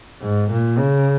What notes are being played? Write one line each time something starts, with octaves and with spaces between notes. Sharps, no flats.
G#2
A#2
C#3